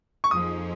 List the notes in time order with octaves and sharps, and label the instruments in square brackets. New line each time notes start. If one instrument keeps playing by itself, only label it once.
[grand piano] C#6
[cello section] F2 F3 A#3 D#4 G#4 [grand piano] D#6